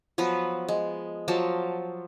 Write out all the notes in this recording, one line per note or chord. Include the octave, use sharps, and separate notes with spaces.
F3 F#3 B3 B4
G#3
F3 F#3 A5